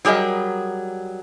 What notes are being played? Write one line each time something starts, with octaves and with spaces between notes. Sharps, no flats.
F#3 G3 G#4 A#4 D#5